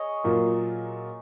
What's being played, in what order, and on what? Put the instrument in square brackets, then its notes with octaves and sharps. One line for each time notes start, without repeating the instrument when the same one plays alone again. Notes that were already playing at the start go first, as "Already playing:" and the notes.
Already playing: [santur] G#4 C#5 D#5
[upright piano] A#2 F#3 A#3 F4 A#4